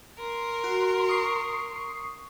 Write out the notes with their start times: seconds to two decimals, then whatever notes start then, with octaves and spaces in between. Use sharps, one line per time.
0.18 A#4 C6
0.64 F#4
1.08 C#6 D#6 C7